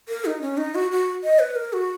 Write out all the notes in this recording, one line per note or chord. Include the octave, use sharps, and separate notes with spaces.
A#4
D#4
C#4
D#4
F#4
F#4
D#5
B4
A#4
F#4